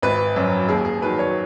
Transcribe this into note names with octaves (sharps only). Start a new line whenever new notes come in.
G#1 B4
F#2 F#3
D#2 G#4
G#4
D#3 F#3 B4
C#5